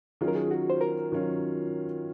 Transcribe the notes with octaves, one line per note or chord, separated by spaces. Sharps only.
D#3 F#3 C#4 F4 G#4
A#4
G#4
F#4
C5
A#4
D#3 F#3 C#4 F4